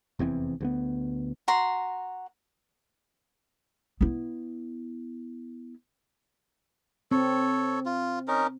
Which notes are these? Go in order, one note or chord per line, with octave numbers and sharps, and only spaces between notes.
F1 E2 E3 C4
D2 G3 B3
F#4 A#5 C6
B3 E4
C4 A4 C#5
F4
C#4 D#4 A#4